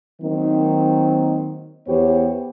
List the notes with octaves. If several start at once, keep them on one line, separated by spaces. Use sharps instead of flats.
D#3 F#3 A#3 C4
E2 B3 G4 C5 C#5